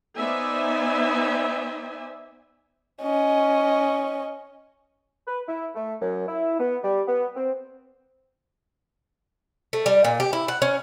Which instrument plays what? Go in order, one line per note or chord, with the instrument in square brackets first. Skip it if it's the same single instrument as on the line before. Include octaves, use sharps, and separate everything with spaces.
[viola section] B3 D#4 C5 D5 E5 G#5
[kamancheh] C#4 D#5
[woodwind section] B4
E4
A3
F#2
E4
B3
G3
B3
C4
[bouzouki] A3
G3
A#2
G4
E4
F#5
C#4